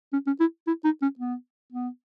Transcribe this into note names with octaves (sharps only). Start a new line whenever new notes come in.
C#4
C#4
E4
E4
D#4
C#4
B3
B3